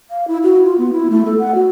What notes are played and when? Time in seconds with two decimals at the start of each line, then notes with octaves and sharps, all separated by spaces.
0.11 F5
0.28 E4
0.43 F#4
0.65 F4
0.78 B3
0.93 E4
1.10 A3
1.25 A4
1.39 F#5
1.55 F#4